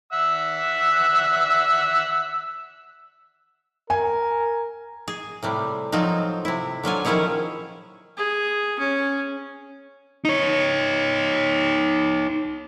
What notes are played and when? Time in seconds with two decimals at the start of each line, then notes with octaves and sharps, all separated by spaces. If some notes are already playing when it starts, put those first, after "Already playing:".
0.13 E5 F#5 E6
3.90 A#4 G#5
5.08 G#4
5.43 A2 C3 G3
5.92 F3 F#3 C4 D#4
6.45 C3 E4
6.83 D3 F#3 F4 G#5
7.05 D#3 F3 C#4 E4 G#4 C#5
8.17 G#4
8.79 C#4
10.25 D#4 C#5